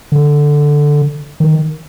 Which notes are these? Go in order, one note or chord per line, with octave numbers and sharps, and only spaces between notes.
D3
D#3